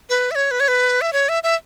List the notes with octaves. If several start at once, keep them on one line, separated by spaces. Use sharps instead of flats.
B4
E5
C#5
B4
C#5
B4
E5
C#5
E5
E5